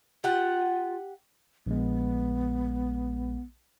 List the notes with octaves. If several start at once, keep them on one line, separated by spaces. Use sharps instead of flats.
F4 G4 F#5
A#1 G#3 B3